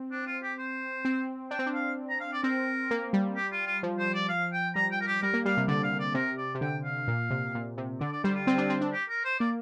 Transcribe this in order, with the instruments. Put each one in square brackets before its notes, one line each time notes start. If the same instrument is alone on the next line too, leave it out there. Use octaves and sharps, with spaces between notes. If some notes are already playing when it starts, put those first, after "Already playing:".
Already playing: [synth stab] C4
[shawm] D4
F4
G4
C5
[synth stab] C4
[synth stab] D4 [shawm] G5
[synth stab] C4
D4
[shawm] F5
A#5
F5
D5
[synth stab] C4 [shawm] A#4
[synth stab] A#3
G3
[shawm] G4
F4
F4
[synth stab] F3
[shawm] C5
D5
F5
G5
[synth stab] G3 [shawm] A#5
[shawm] G5
A#4
G4
[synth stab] G3 [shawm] A#4
[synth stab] A#3
[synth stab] G3 [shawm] F5
[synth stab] C3
[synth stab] D3 [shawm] D5
[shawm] F5
D5
[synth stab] C3 [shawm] A#4
[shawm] D5
[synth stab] C3
[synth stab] D3 [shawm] G5
[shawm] F5
[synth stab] A#2
C3
A#2
C3
[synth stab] D3 [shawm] D5
[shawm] D5
[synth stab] G3 [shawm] C5
[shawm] F4
[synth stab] C4
D4
C4
D4
[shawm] G4
A#4
C5
[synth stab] A#3 [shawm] D5